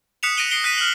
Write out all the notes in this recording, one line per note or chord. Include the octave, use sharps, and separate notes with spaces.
D#6 F#6 B6 C#7 E7 F7
A#6 D7 D#7 G7
C7 D7 G7
F#6 B6 D#7
F6 F#7